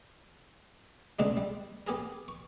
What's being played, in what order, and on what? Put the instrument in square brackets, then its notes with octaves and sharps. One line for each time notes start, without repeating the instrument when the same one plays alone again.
[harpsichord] C#2 B2 G#3 D4 D#4
G3
B3 G4 G#4 A#4
C#6